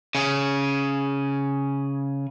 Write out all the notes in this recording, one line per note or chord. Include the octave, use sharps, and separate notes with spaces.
C#3 G#4